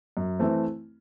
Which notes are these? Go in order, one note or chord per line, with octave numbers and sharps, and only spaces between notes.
F#2
E3 A3 C4